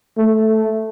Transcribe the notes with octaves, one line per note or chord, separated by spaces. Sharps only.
A3